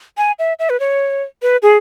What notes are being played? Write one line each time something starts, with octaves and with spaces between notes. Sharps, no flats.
G#5
E5
E5
B4
C#5
B4
G#4